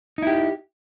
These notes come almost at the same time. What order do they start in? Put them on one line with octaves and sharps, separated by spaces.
D#4 E4 G4